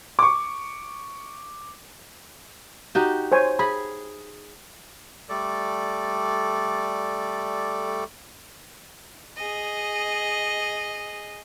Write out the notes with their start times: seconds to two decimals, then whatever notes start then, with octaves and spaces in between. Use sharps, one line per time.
0.19 C#6 D6
2.95 D#4 F#4 G4
3.32 C5 C#5 G#5
3.59 G#4 B5
5.29 G3 A3 A4 D5
9.37 G#4 D#5